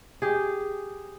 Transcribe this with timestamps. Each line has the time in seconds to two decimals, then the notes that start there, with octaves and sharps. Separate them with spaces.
0.22 G4 G#4